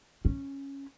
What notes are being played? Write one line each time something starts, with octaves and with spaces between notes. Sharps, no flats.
C#4